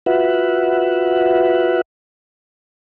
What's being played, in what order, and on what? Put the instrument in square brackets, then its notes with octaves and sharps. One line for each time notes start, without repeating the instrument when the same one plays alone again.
[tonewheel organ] F4 F#4 B4 E5 F#5